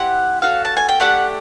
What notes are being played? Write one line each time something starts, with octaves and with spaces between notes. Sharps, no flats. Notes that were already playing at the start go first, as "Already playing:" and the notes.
Already playing: C4 E4 G4 F#5
C#4 F#4 A4 F5
A5
G#5
G5
A3 D4 G4 F#5